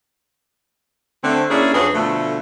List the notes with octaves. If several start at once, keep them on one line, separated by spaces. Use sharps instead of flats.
D3 A3 C4
A#3 C#4 D4 E4 G#4
F2 D4 F#4 G#4 B4 C#5
B2 D3 F3 A3